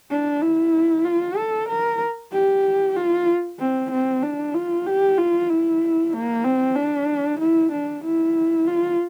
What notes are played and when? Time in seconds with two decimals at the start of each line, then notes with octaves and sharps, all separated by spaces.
0.10 D4
0.41 E4
1.04 F4
1.36 A4
1.68 A#4
2.32 G4
2.96 F4
3.59 C4
3.90 C4
4.22 D4
4.54 F4
4.86 G4
5.18 F4
5.49 E4
6.13 A#3
6.44 C4
6.76 D4
7.39 E4
7.71 D4
8.04 E4
8.67 F4